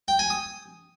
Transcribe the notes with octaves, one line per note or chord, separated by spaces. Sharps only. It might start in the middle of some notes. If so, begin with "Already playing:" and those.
G5
G#5
D#6